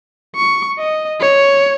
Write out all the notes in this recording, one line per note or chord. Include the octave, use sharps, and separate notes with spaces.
C#6
D#5
C#5